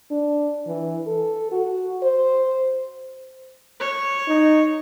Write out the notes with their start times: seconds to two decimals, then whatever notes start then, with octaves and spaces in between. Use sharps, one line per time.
0.11 D4
0.67 E3
1.07 A4
1.52 F#4
2.03 C5
3.80 C#5
4.28 D#4